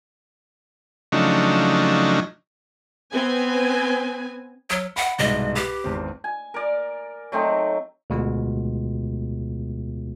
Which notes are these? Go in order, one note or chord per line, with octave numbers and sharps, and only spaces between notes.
C#3 F3 F#3 A3 D4 D#4
B3 C4 B4 G#5
F#3 E6 F6 C#7
F#5 B5
C2 G#2 B2 D#5
G4 B4 C7
G#1 E2 C4
G#5
A#4 D5
F#3 A3 C4 D#4
D2 B2 G#3 B3 F4